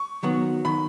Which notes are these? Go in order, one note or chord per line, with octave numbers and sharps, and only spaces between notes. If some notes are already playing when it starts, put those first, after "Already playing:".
Already playing: C#6
D#3 F#3 B3 F#4
D#3 B5